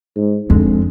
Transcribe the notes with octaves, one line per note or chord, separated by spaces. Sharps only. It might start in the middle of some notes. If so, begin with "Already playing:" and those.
G#2
F2 D3 G#3 C4